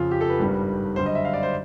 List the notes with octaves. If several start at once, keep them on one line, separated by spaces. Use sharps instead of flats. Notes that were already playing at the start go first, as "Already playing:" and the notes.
Already playing: F2 C#3 F3 F4
G4
A4
B4
G#1 G2 D#3 G3
F#2 D3 G3 C5
D#5
E5
F5
D5
C5